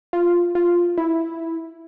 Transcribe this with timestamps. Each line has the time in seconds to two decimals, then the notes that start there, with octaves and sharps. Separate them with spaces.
0.13 F4
0.55 F4
0.98 E4